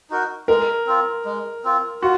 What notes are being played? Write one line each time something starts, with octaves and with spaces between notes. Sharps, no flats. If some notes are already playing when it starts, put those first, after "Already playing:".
D#4 F#4 A#4
G#3 A#4
C4 F4
G#3
C4 F4
F4 F#4